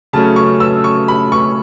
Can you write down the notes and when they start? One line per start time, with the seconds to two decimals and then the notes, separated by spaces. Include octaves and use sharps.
0.13 C#3 F#3 A3 C#4 A5
0.36 C#6
0.60 E6
0.84 C#6
1.08 B5
1.32 C#6